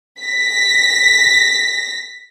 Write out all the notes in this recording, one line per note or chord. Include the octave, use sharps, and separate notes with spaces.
A#6 B6